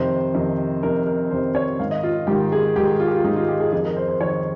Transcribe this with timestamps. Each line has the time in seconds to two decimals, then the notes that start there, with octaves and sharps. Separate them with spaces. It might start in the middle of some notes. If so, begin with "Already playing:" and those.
Already playing: F2 C3 D#3 C5
0.34 F2 C3 D#3
0.82 F2 C3 D#3 A#4
1.07 A#4
1.31 F2 C3 D#3 C5
1.55 C#5
1.79 G#2 D#3 F5
1.91 D#5
2.03 F4
2.27 G#2 D#3 G4
2.52 G#4
2.76 G#2 D#3 G4
3.00 F4
3.08 G4
3.15 F4
3.24 G#2 D#3 D#4
3.36 F4
3.49 G4
3.60 G#4
3.72 F2 D#3 G#4
3.85 A#4
3.97 C5
4.09 C5
4.21 F2 D#3 C#5